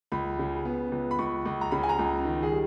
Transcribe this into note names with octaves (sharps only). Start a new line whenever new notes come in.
C#2 B5
C#3
B3
C#2
B5
C#2 C#6
C#2
A#5
C#3 B5
G#5
A#5
C#2
D#3
G#4
G3